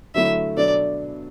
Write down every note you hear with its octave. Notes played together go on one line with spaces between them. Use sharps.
D3 F#3 A3 E4 E5
B2 F#3 B3 D4 A4 D5